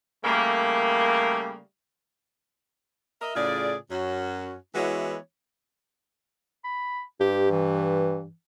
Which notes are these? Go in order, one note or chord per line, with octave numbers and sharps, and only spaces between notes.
C#3 G3 A3 A#3
A#4 D#5 E5
A2 C#3 F4 G#4 D5
F#2 C#4 F#4
E3 G#3 B3 E4 F#4 C#5
B5
G2 G4
E3